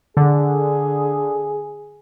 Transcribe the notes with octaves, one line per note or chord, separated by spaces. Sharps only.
D3 G#4